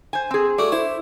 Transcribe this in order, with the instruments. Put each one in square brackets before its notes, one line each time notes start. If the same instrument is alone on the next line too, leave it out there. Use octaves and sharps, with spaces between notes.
[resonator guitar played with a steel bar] C5 G#5
C4 G#4
[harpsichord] A3 F#4 [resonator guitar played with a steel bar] D5
[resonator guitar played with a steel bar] E4 [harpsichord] C5